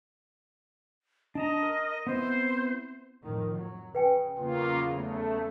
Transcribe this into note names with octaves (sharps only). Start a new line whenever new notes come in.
D4 D#5 A5 A#5
A#4
B3 C4 E4 C5
F2 A2 D#3
F#3
C#3 B4 G5 G#5
E2 C#3 F#3 A#3 F4
A3